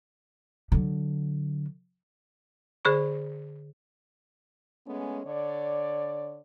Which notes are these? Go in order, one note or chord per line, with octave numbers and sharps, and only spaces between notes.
D3 F#3
D3 G#4 C5 B5 C#6
G#3 A3 B3 C#4
D3 C#5 D5